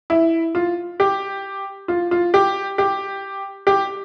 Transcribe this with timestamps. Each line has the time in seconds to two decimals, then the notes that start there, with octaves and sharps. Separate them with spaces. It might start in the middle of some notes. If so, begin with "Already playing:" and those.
0.10 E4
0.55 F4
1.00 G4
1.88 F4
2.11 F4
2.34 G4
2.78 G4
3.67 G4